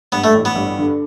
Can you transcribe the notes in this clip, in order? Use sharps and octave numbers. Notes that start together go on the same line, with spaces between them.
G2 B3
A3
A1
B3
G2
D3